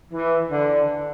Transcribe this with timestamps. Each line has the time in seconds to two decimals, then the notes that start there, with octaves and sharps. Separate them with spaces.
0.11 E3
0.51 D3